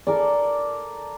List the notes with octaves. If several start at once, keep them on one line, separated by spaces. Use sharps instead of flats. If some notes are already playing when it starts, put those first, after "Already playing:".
A4 A#4 D5